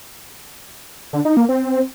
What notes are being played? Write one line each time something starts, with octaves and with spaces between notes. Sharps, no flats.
D3
D#4
A#3
C4